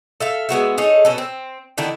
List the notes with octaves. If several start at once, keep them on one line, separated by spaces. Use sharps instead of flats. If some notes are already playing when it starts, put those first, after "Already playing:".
A4 E5 F5
G#3 B3 F#4 E5
D#4 G#4 A4 C#5
B2 C#4 A4
C4
D3 D#3 D4 E4